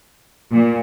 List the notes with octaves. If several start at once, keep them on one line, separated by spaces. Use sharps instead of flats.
A#2